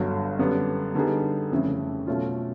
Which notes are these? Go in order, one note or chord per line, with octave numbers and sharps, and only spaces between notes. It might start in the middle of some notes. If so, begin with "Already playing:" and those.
Already playing: G1 G2 D3 F#3
F#2 D3 G3 B3 D4
D3 G3 B3 D#4 G#4
F1 F2 C#3 E3 A3
B2 F#3 A3 C#4 F4